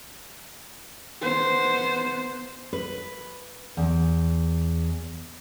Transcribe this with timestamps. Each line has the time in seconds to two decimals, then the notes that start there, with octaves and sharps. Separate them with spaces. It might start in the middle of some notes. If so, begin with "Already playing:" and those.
1.22 B3 C5
2.73 B4
3.77 E2